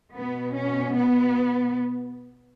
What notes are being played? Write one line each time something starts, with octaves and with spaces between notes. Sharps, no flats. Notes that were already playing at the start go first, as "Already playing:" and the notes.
B2 B3
C#4
B3